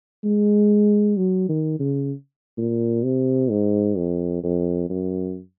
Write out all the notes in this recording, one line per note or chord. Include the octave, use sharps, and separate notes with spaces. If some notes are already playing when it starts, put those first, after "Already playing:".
G#3
F#3
D#3
C#3
A#2
C3
G#2
F2
F2
F#2